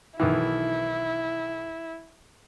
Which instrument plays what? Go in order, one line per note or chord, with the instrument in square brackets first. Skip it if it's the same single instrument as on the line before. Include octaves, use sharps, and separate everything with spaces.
[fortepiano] B1 D#3 E3 [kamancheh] E4